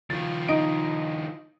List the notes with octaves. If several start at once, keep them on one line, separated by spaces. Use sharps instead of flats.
D#3 F3 A6
D#4 D#5 D7